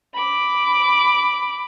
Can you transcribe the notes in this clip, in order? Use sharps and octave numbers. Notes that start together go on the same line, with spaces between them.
B5 D6